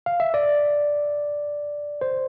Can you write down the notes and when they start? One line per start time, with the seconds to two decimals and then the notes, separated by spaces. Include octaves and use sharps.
0.06 F5
0.20 E5
0.34 D5
2.01 C5